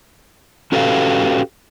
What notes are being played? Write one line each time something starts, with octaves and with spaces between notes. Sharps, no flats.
C#4 F#4 G4 A4 B4 F5